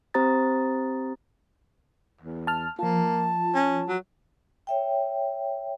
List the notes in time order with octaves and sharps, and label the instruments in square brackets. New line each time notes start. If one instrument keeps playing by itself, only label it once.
[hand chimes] C4 G4 C5 A#5 D#6 A6
[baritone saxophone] E2
[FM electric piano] A5 F6
[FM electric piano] F3 F4 [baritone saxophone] A#3 [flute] A5
[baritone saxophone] C#4
F#3
[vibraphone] C#5 E5 G5